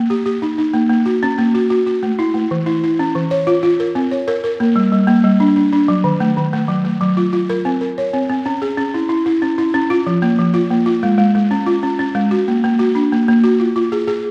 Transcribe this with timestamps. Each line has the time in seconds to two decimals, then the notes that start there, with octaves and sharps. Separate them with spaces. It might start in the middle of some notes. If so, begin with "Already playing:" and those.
Already playing: A#3
0.10 G4
0.26 G4
0.42 D#4
0.58 D#4
0.74 A#3
0.89 A#3
1.06 F#4
1.23 C#4
1.38 A#3
1.55 F#4
1.70 F#4
1.87 F#4
2.03 A3
2.19 E4
2.34 A3
2.51 E3
2.66 E4
2.84 E4
2.99 C#4
3.15 E3
3.31 C#5
3.47 F4
3.63 F4
3.80 A#4
3.95 C4
4.11 C#5
4.28 A#4
4.44 A#4
4.60 A#3
4.76 G3
4.92 G3
5.07 A#3
5.24 G3
5.40 D4
5.56 D4
5.73 D4
5.88 F#3
6.04 D#3
6.20 A3
6.37 D#3
6.53 A3
6.68 F#3
6.85 A3
7.01 F#3
7.17 F4
7.33 F4
7.50 A#4
7.65 C4
7.81 A#4
7.98 C#5
8.13 C4
8.29 C4
8.46 C#4
8.62 G#4
8.78 C#4
8.94 E4
9.09 E4
9.26 E4
9.42 C#4
9.58 E4
9.74 C#4
9.90 F4
10.07 F3
10.22 A#3
10.39 F3
10.54 F4
10.70 A#3
10.86 F4
11.03 G#3
11.18 G#3
11.35 G#3
11.51 C#4
11.66 F4
11.83 C#4
11.99 C#4
12.15 G#3
12.31 F#4
12.48 A#3
12.64 A#3
12.79 F#4
12.95 D4
13.12 A#3
13.28 A#3
13.44 F#4
13.60 F4
13.76 F4
13.92 G#4
14.07 G#4